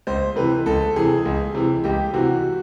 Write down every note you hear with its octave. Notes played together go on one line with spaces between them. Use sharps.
C#2 C5
C3 E3 B4
C#2 A4
C3 E3 G#4
C#2
C3 E3
C#2 G4
C3 E3 F#4